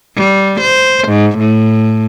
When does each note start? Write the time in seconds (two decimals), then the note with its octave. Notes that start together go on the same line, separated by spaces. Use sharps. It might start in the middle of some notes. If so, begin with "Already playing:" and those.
0.16 G3
0.61 C5
1.08 G#2
1.39 A2